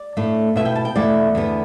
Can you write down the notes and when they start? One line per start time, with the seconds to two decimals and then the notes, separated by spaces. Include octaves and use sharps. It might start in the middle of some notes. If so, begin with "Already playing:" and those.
Already playing: D5
0.17 A2 A3 D4
0.56 B2 B3 E4 E5
0.65 G5
0.75 A5
0.85 G5
0.96 E2 B2 A3 E4 D5
1.35 E2 D3 B3